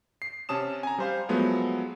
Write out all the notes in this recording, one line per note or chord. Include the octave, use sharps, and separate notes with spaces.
C7
C3 C#4 A5 D#6 E7
G#5 A#5
G3 C5 F5
F3 F#3 G#3 A3 B3